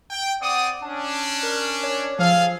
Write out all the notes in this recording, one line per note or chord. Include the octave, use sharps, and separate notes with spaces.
G5
C4 D5 F#5 D#6
C#4 D4 A5
A#4
C#5
F3 G#4 A4 F5